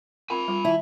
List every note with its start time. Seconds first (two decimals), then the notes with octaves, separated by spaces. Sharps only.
0.30 C4 F4 A#4 G#5 B5
0.48 G3 F4 C6
0.65 D#3 E4 E5 A5